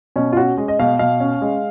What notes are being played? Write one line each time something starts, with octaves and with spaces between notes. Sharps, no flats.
B2 C#4
F4
C#4 F#4
G#3 D#5
D#5
B2 F5
B2 F5
C#4
G#3